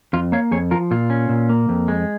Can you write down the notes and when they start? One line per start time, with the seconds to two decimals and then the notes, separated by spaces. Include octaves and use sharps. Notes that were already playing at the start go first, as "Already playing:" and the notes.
0.13 F2 F4
0.32 A#3 C#5 F5
0.51 F2 G#4 C#5
0.71 F3 F4 A#4
0.91 A#2 F4
1.10 C#4
1.29 A#2
1.49 A#3
1.69 F2
1.88 G#3